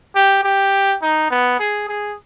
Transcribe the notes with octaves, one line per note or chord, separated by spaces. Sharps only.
G4
G4
D#4
B3
G#4
G#4